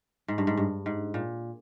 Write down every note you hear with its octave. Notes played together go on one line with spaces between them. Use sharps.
G#2
G2
G#2
G2
G#2
A#2